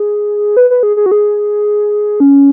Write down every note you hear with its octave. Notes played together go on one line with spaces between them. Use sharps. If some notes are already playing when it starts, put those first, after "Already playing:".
Already playing: G#4
B4
B4
G#4
G#4
F#4
G#4
C#4